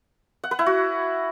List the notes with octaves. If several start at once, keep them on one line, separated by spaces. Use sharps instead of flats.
F#5
B4
E4
F#4